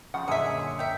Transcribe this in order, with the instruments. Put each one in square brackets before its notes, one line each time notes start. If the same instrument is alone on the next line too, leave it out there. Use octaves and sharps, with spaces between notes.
[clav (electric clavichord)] C#3 F3 [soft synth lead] F#5
[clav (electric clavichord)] F#2 A#2 D3 [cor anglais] G#4 [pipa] D#5 E5 [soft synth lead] C#7
[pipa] A#4 E5 [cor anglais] G5